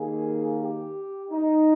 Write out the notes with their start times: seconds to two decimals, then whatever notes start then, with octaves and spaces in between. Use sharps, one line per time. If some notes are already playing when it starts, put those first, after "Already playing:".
Already playing: D#2 D#3 A#3 G#4
0.61 G4
1.31 D#4